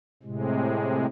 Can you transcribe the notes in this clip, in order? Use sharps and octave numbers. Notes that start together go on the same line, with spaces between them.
A2 C3 G#3